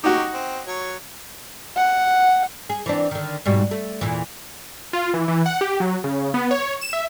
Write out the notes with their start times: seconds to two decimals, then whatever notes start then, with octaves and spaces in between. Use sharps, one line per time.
0.04 F#3 D#4 F#4 G4
0.34 C4
0.67 F#3 C#5
1.76 F#5
2.70 G#4
2.86 E3 C4 D4
3.11 D3 D#3
3.46 G#2 B2 G3
3.71 A3
4.01 E2 A#2 E3
4.93 F4
5.14 E3
5.28 E3
5.46 F#5
5.61 G4
5.80 F#3
6.04 C#3
6.34 B3
6.51 C#5
6.81 E7
6.93 E5